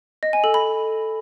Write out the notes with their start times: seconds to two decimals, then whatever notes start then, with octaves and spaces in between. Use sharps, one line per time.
0.23 D#5
0.33 G#5
0.44 A4
0.54 B5